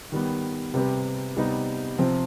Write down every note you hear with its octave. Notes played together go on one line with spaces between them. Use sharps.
D#3 G3 B3
C3 G3 C4 G4 B4
C3 G3 B3 D#4
C3 F3 C4